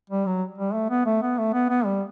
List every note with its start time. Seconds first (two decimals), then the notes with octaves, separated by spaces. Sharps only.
0.10 G3
0.26 F#3
0.58 G3
0.74 A3
0.90 B3
1.06 A3
1.22 B3
1.38 A3
1.53 B3
1.69 B3
1.85 G3